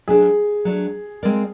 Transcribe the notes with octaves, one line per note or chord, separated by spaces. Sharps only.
F#3 A3 D4 G#4
F#3 A3 D4
G#3 C4 F4 A#4 D5